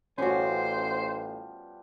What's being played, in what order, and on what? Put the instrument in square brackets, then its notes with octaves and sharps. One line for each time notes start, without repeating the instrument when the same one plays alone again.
[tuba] A1 [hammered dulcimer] F3 G3 B3 [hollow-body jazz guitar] C#4 F#4 [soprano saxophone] C5